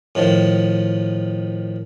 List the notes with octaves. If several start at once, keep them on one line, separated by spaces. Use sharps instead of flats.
A2 D#3 F3